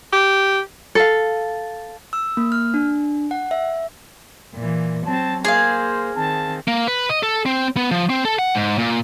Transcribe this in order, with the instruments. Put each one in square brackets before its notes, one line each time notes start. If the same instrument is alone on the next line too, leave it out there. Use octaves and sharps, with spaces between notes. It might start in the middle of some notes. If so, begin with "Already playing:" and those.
[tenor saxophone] G4
[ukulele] A4 F5
[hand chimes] E6
A#3
F6
D4
F#5
E5
[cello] A#2 E3
[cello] F#3 C4 [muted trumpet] A5
[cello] A#3 [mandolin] G#4 F5 [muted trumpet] C5
[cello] D#3 C4 [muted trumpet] A5
[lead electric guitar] A#3
B4
D#5
A4
C4
B3
F3
C4
A4
F#5
G#2
A#2